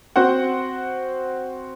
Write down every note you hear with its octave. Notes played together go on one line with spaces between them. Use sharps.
C4 F#4 C5 F#5